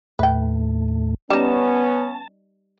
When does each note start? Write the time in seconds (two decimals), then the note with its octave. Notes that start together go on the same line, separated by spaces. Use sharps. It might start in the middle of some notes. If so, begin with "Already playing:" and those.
0.19 D#2 A2 A3 B4 G5
1.30 G3 B3 C#4 D#4 A5